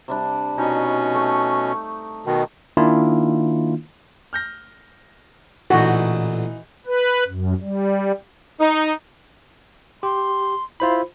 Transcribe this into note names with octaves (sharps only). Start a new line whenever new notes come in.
C3 G3 D4
B2 C#4 D#4
A3 C#6
B2 D#3
D#3 A#3 D4 E4 F4
F6 G6 A#6
A1 A#2 D3 E3 D#4 F#4
B4
F#2
G3
D#4
G4 C6
E4 F4 C5 B5